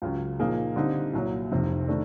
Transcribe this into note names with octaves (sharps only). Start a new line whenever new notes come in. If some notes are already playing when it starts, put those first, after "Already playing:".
C#2 C#3 F#3
A#2 F3 A#3 D#4 G#4
D3 G3 C4 D#4
C2 A#2 F#3
F1 F2 C3
D#3 A3 D4